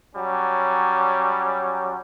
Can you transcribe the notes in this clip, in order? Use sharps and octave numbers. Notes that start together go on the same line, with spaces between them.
F#3 G3 C#4